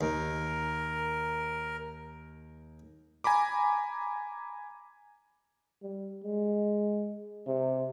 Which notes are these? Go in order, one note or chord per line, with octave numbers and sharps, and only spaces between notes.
D#2 A#4
G#5 A#5 B5 D6
G3
G#3
C3